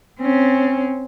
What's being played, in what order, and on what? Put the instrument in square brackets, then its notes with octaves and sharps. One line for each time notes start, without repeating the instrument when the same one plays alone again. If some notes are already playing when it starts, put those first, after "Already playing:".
[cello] C4 C#4